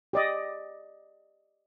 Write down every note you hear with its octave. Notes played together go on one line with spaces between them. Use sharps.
G4 D5 D#5